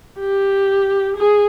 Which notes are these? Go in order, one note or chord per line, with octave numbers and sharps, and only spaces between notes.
G4
G#4